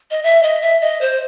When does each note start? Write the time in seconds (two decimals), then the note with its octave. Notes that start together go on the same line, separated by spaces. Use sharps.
0.11 D#5
0.23 E5
0.43 D#5
0.62 E5
0.81 D#5
1.01 C5